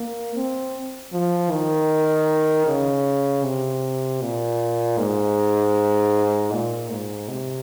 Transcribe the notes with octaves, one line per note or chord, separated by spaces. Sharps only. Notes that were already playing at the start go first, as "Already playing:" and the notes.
Already playing: A#3
C4
F3
D#3
C#3
C3
A#2
G#2
A#2
G#2
C3